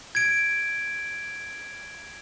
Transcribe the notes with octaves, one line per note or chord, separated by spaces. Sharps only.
G#6 D7